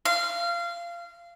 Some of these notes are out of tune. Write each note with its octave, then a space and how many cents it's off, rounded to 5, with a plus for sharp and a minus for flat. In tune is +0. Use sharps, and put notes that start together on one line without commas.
F5 -25